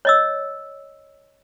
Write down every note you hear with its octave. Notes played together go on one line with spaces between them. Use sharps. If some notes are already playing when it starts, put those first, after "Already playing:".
C#5 D#5 E6